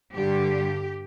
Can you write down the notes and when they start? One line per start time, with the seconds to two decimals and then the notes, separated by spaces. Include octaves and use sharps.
0.14 G2 D3 G3 G4